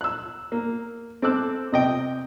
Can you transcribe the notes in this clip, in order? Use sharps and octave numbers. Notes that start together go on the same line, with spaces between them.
E6 F#6
A#3
C4 A4 A5 D6 E6 F#6
C3 D#5 G5